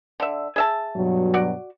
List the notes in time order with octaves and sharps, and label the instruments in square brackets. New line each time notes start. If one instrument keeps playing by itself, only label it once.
[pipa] D3 E5
G#4 E5 A5
[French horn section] G2 B2 F#3
[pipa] F#4 D5